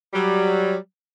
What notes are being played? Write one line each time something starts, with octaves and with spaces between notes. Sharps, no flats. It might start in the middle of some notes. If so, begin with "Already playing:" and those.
F#3 G3